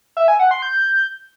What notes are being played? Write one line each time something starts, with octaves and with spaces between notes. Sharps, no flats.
E5
G#5
F#5
C6
G6